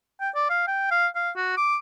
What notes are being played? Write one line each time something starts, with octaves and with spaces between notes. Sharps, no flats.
G5
D5
F5
G5
F5
F5
F#4
D6